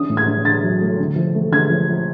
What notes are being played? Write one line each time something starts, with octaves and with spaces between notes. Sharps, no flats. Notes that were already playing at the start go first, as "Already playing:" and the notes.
Already playing: C#4 D4 D#6
A2
G#6
D4
D4 A6
F#3
A3
D3
F3
A3
D3 G#6
F3
F3